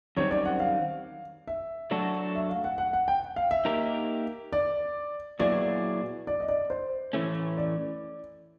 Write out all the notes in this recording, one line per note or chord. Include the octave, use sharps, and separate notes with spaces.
F#2 D#3 G3 C4 C#5
D5
F#5
F5
E5
F#3 A3 D4 F#4 A4
E5
F5
F#5
F#5
F#5
G5
F5
E5
A#3 D#4 G4 A#4
D5
A#2 F#3 B3 E4 G#4 D5
D5
D#5
D5
C5
A2 E3 A3 C#4
D5